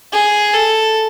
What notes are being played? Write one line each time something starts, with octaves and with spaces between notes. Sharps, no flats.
G#4
A4